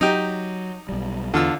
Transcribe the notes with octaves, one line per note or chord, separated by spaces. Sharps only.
F#3 D#4 G4
B1 G3
E2 D3 F4 E6